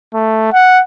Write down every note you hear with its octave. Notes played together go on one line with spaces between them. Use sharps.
A3
F#5